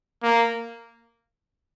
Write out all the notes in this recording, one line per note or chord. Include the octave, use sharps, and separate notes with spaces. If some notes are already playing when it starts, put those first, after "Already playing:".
A#3